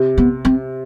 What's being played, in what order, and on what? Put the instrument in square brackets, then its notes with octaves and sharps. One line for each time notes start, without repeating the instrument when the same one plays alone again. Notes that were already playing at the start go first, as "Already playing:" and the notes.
Already playing: [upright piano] C3
[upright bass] B3
C4